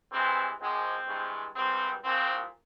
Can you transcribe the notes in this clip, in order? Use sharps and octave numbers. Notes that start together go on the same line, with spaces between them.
G2 E3 G#3 C4
G#1 G#2 F3 G#3 C4
G2 E3 G#3
G#1 G2 G3 C4
C2 A#2 F3 C4